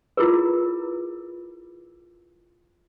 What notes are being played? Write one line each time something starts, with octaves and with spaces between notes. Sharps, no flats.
E4 F4 G#4 A#4 B4